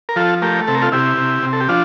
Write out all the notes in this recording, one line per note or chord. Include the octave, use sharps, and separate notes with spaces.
A#4
F3 F4 A4
A3 G4 A#4
C3 A4
A#4
F4 A4
C3 E4 G4
C3
C3
A4
G4
F3 D4 F4